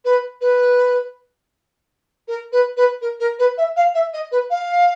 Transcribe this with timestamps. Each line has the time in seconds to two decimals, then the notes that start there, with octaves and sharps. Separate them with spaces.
0.04 B4
0.41 B4
2.28 A#4
2.52 B4
2.77 B4
3.01 A#4
3.20 A#4
3.39 B4
3.57 E5
3.76 F5
3.94 E5
4.13 D#5
4.31 B4
4.50 F5